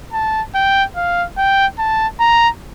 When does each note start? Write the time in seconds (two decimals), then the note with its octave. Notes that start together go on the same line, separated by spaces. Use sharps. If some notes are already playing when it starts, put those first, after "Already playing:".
0.13 A5
0.54 G5
0.96 F5
1.37 G5
1.78 A5
2.19 A#5